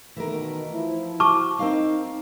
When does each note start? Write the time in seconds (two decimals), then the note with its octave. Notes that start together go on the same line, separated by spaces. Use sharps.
0.16 B2 D#3 E3 A3 A#4
0.73 F3 E4
1.20 F#4 A5 C#6 D6
1.59 C4 D#4 A#4 F5